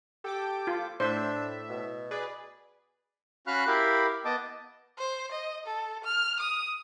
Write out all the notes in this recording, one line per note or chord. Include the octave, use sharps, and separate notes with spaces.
G4 A4 G5 D6
F4
A2 D4 C5 E5
B2
G#4 B4 D5
C#4 F#4 F5 B5 F6 F#6
E4 G4 A#4 F5 B5
B3 D#5 A5 D6
C5
D#5
A4
F6
D#6